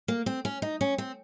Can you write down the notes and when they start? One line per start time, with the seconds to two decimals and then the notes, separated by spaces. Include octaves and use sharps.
0.08 A#3
0.26 C4
0.45 C#4
0.62 D#4
0.81 C#4
0.98 C4